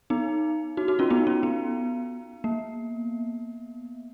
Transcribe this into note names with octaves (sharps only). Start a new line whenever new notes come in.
B3 D#4
D#4 F#4
D#4 F#4
C#4 F4
B3 D#4
C#4
B3
A#3